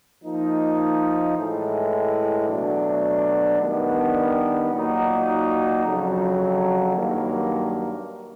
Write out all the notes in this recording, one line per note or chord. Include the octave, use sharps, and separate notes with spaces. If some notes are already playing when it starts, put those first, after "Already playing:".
F3 A#3 D#4
A2 E3 G#3
B2 F#3 A3 D4
D#3 G3 B3 D4
A#2 F#3 A#3 D#4 F#4
F2 C#3 F#3
G2 D#3 F#3 A#3